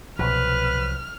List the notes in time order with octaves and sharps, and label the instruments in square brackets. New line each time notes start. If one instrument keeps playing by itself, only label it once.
[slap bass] C2 F3 F#3 [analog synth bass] B2 [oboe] B4 [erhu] F6